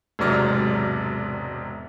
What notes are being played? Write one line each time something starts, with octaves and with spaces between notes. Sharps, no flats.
E1 G#2 C3 F#3 D5 F6